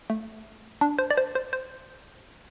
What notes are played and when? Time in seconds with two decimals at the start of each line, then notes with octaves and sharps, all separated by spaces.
0.10 A3
0.81 D4
0.99 C5
1.10 D5
1.17 C5
1.35 C5
1.53 C5